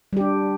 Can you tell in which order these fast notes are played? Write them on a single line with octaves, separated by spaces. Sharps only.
G3 G4 D4